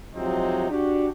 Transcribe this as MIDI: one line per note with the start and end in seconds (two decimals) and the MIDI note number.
0.15 0.66 48
0.15 0.66 53
0.15 0.66 54
0.15 0.66 56
0.15 0.66 60
0.15 0.66 63
0.70 1.08 62
0.70 1.08 66
0.70 1.08 67